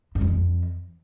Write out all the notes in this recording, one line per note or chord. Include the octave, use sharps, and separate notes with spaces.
G2
F2